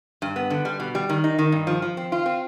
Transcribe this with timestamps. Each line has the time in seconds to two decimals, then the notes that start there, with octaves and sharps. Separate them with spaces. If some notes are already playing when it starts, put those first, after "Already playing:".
0.22 G2
0.36 B3
0.50 D3
0.65 G3
0.80 B2
0.95 G3
1.09 D#3
1.24 D#4
1.39 D#3
1.52 G2
1.67 F3
1.82 F3
1.97 C4
2.12 F4
2.26 C4